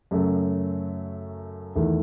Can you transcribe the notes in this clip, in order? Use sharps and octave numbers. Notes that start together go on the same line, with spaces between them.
F#2 C#3 F#3 A3
E2 D#3 A3 E4